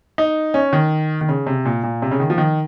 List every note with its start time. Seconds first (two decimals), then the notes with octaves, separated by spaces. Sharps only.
0.18 D#4
0.54 C#4
0.73 D#3
1.21 D#3
1.29 C#3
1.47 C3
1.65 A#2
1.83 A#2
2.02 C3
2.11 C#3
2.20 D#3
2.30 F3
2.38 D#3